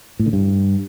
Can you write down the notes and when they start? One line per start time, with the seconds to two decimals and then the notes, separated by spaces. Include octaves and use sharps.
0.19 A2
0.26 D3
0.33 G2